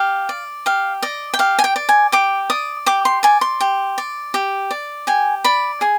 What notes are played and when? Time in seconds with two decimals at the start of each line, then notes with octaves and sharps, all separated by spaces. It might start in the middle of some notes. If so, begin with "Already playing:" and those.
Already playing: G4 F5
0.29 D5
0.66 G4 F5
1.02 D5 D#5
1.34 G5
1.39 G4 F5
1.59 G#5
1.64 G5
1.76 D5
1.89 G#5
2.12 G4 D6
2.50 D5 D#6
2.86 G4 D6
3.05 C6
3.23 D5 G#5
3.41 C6
3.61 G4
3.98 D5
4.34 G4
4.71 D5
5.07 G4 G#5
5.44 D5 B5
5.81 G#4 G#5